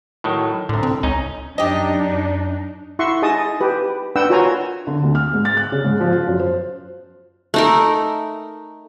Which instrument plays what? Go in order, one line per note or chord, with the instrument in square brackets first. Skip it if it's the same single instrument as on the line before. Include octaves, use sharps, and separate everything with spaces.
[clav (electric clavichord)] A2 D#3 F#3
[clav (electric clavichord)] C2 D3 [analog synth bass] A2
[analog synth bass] C4
[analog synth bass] C#2 [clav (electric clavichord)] C#4 D#4
[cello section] F#2 D4 D#4 [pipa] G4 D#5
[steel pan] E4 E5 F#5 C6 C#6
D#4 G#4 D#5 A5 D#6
G4 B4
D4 B4 F#5 G5 E6
F4 F#4 A#4 C#5 G#5 A#5
[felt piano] D3
D2
F6
G#2
A6
F#6
C#3
G#2
F3
F4
F#2
C5
[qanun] A3 D#4 A#4